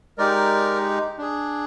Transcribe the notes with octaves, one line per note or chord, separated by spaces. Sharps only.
G#3 D#4 G4 A#4 D5
D4 G#4